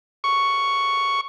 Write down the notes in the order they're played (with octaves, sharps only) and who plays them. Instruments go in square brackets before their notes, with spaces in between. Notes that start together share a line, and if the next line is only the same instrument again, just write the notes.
[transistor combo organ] C#6